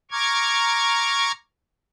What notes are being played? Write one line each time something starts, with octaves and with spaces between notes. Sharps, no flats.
A#5 C#6 D6 F6 G#6